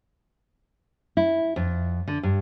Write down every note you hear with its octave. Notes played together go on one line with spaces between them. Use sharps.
E4
F2
D3
G2